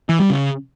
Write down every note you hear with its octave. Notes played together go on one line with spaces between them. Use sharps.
E3
G3
C#3